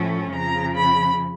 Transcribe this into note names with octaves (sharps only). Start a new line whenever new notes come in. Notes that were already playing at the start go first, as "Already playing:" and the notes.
Already playing: A2 F3 A3 C#4
F2 C#3 F3 A#5
B5